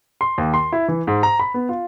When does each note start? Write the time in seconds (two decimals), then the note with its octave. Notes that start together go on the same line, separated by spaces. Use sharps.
0.21 C6
0.38 D#2
0.54 C6
0.72 E4
0.88 E3
1.07 G#2
1.23 A#5
1.39 B5
1.54 B3
1.69 F4